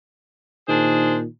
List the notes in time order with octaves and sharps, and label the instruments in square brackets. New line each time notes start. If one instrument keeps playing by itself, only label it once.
[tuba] A#2 [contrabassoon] D#3 [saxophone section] D4 G#4 C5